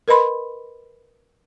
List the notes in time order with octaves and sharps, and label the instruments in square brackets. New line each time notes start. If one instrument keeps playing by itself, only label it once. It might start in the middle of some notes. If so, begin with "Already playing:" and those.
[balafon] A#4 B4 D#5 B5 C6